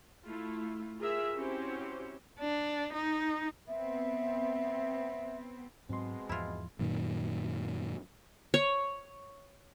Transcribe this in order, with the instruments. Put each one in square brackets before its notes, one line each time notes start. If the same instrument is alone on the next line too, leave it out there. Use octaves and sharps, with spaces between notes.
[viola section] A3 E4 F4
F4 G#4 A#4 E5
C4 C#4 E4 F#4 G4 C5
[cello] D4
D#4
[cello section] B3 C4 [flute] E5
[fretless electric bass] G#2 F#3 [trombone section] B2 G#3 [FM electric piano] C4 C6
[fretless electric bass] E2 G#2 F3 [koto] E4 F4
[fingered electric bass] F#2 A#2 D#3
[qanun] C#5